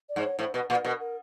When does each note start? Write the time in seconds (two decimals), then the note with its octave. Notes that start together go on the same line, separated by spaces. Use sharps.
0.09 D5
0.16 G#2
0.24 C#5
0.39 A2 C5
0.54 B2 B4
0.70 A#2 B4
0.85 B2 A#4
1.00 A#4